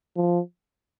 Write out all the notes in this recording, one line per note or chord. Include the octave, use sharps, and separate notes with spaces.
F3